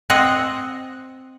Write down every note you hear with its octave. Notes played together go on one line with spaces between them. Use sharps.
C4 C5 D#5 F#5